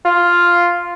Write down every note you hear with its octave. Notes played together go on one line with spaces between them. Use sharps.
F4